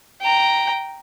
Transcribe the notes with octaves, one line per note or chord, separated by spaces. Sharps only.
G5 A#5